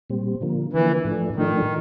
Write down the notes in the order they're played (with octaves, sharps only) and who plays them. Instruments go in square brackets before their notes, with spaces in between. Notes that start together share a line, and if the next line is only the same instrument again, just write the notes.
[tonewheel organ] A#2 G3 C4
D3 F3 A#3
[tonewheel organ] D3 F3 A#3 [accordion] E3
[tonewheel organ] A2 F3 A3 D4
[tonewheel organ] A2 F3 A3 D4 [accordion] D#3